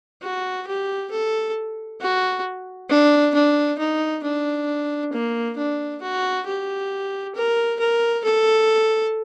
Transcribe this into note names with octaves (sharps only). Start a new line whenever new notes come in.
F#4
G4
A4
F#4
D4
D4
D#4
D4
A#3
D4
F#4
G4
A#4
A#4
A4